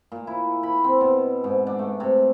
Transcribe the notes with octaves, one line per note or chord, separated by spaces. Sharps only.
A#2
E4
B5
C4
B2
G#2
D4
A3
C3